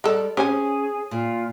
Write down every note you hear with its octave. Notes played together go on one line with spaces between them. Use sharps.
G3 G#3 A4 D5
C#4 G4 G#4 C5 G#5
A#2 F4